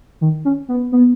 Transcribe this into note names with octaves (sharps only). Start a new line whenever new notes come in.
D#3
C#4
B3
B3